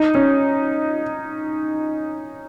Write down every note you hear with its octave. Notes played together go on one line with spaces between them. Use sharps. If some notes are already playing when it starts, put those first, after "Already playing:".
Already playing: D#4
C#4